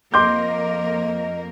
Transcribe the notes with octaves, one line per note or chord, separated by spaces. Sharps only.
F2 A#3 A#4 D#5 C6 D6 G6